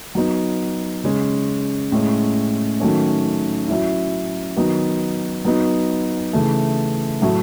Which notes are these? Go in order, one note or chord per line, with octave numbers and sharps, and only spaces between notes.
F#3 B3 D#4
C#3 G#3 C#4
A2 G#3 C#4
D#3 F#3 A3 C#4
F#3 C#4 E4
D#3 F#3 B3 D#4
F#3 B3 D#4
C#3 E3 A3
A2 F#3 A3 E4